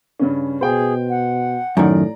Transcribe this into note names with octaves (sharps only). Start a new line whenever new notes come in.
G2 C#3 C#4
B2 G#4 C5 G5
F#5
F#2 A2 D#3 D5 A#5